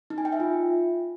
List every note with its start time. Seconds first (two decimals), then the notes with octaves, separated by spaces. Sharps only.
0.10 D#4
0.18 G#5
0.25 G5
0.32 E5
0.40 F4